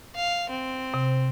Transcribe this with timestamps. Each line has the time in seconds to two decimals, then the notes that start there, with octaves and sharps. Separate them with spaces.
0.15 F5
0.50 C4
0.94 C3